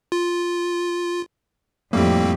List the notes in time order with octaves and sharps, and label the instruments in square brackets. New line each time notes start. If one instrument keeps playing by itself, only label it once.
[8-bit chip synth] F4
[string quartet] F2 G4 [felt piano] A2 G3 [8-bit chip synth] A#3 C4